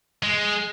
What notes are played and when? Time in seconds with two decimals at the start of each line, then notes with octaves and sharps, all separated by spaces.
0.23 G#3